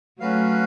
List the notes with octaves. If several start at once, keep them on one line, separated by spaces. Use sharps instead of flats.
F#3 A3 C#4 F#4 B4 F5